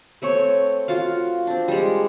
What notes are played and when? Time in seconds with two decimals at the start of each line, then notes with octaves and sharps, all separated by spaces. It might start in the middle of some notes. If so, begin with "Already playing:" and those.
0.22 A3 C4 C#5
0.88 F4 F#4 F5
1.47 C4 D4
1.68 G3 G#3